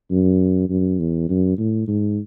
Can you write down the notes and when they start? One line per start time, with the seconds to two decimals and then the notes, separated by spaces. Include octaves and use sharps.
0.11 F#2
0.69 F#2
0.99 E2
1.29 F#2
1.58 A2
1.88 G#2